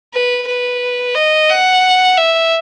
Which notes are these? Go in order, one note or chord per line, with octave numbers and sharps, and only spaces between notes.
B4
B4
D#5
F#5
E5